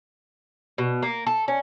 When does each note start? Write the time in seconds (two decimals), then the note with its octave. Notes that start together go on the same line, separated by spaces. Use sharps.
0.78 B2
1.03 A#3
1.26 A4
1.48 C#4